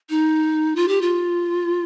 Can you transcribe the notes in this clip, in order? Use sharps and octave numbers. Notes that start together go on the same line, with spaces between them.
D#4
F4
G4
F4